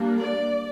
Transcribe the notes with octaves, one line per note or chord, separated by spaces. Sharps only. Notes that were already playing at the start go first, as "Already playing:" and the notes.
Already playing: G3 A#3 D4
D5